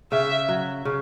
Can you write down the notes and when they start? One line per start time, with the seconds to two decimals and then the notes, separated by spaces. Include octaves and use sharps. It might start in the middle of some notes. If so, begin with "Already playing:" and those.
0.12 C#3 E5
0.49 F#3
0.85 C#3